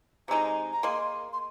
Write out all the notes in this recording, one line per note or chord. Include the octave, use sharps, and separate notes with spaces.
C3 G#3 D#4 A#5
A#5
A#3 G#4 D#5 C6
C6